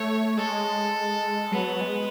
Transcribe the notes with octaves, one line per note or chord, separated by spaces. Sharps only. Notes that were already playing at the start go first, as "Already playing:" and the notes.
Already playing: A3 C#5
G#3 A4
F#3 B3
G#3